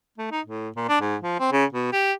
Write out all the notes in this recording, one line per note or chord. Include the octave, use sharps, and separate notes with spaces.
A3
D#4
A2
A#2
D4
G#2
F3
C4
C#3
B2
G4